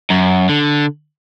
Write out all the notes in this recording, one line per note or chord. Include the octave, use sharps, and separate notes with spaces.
F#2
D3